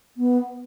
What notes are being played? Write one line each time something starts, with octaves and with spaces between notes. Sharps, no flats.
B3